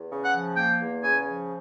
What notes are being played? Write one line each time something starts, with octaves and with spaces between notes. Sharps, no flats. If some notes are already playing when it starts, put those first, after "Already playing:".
Already playing: E2
C#3
F#5
F3
A#3 G5
E2
C#3 G#5
F3